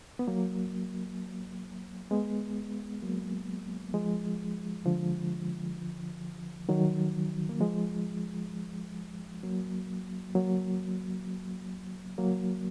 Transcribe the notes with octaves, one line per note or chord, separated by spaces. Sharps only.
B3
F#3 A#3
G#3 B3
F#3 A#3
F3 G#3
D3 F3
D#3 F#3
A#3
F3 G#3
F#3 A#3
F#3 A#3
F#3 A#3